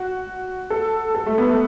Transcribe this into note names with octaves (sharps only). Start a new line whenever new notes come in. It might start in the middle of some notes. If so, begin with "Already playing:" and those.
Already playing: F#4
A4
A4
A3
B3
A3